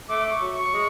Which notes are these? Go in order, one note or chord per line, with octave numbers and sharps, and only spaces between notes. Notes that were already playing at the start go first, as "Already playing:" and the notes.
A3 D6
C#6
F#3
C#6
G#3